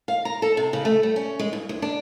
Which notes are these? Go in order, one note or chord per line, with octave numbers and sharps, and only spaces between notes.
F5
A#5
A4
C3
C#3
A3
G3
C#4
G#3
G2
D2
D4